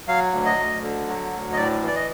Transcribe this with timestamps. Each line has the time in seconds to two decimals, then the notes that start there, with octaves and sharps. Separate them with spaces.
0.07 F#3 F5
0.32 D2
0.45 D#5
0.58 D2
0.83 D3
1.08 F#3
1.32 D2
1.53 D#5
1.57 A2 D5
1.82 E3
1.87 D5
1.95 D#5